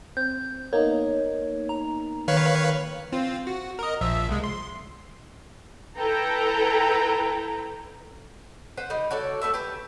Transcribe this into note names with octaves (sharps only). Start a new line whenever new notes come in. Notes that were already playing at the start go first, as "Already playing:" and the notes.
C4 G6
A#3 B3 D#4 C#5
A#5
D#3 B4 C#5 F5
C4 F4
F#4
A#4 D#5
A#1 F3 E5
C2 G#3
C6
E4 A4 B4 G5 A#5
B4 C5 F#5
G3 D#4
F#4 A4 C#5 D5
A3 B4 E5
G4 B4